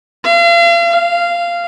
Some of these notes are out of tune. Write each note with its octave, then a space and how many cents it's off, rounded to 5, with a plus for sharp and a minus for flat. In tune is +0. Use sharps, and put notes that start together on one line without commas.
F5 -40
F5 -15